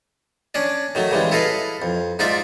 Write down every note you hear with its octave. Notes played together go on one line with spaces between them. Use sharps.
C#4 D4 D5
D#3 F#3 A3
C#3 E3 G3 G#3
E4 A4 B4 D#5 F5
F2
G#2 D#4 F4 D5 E5 D6